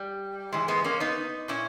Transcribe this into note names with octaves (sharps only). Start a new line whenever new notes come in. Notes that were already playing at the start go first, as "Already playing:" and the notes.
Already playing: G3
G#2 E3 G#3
G#3 B3
A#3 C#4
B3 D#4
A#2 C#4 E4